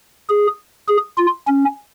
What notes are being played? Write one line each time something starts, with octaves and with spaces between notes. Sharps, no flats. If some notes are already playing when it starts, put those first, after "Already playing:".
G#4
G#4
F4
C#4